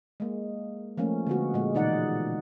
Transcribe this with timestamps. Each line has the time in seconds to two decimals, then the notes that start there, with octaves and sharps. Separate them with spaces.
0.20 G#3 A#3
0.97 F3 A3 A#3 C#4
1.27 D3 G#3 B3 F#4
1.54 A#2 G#3
1.75 B2 E3 D#4 D5 F#5